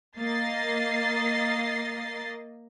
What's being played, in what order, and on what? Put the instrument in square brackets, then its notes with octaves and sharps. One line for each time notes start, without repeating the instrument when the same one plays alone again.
[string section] A#3 D#5 A6 C7